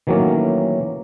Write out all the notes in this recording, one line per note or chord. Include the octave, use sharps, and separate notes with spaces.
D#3 E3 F#3 A3 A#3 C#4